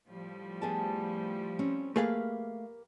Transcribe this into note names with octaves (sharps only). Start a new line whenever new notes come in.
A2 F3 G3
B3 G#4 A5
C4 C#4
A3 A#3 G4 G#4 B4 F5